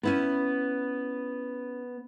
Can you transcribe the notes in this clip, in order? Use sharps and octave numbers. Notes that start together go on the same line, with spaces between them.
B3 C#4 E4 B4